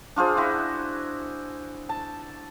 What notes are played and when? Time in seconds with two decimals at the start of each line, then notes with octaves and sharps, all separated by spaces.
0.16 D4 F4 G#4 C5
0.37 E4 F#4
1.89 A5